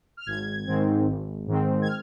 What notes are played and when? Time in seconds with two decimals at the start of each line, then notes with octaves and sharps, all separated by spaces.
0.17 F6
0.26 G#1 G#6
0.67 G#2 D#3 C4
1.07 G#1
1.47 G#2 D#3 C4
1.82 G#6
1.87 F6